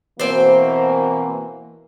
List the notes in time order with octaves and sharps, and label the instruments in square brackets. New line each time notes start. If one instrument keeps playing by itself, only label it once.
[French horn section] B2 E3 A#3 [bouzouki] C4 C5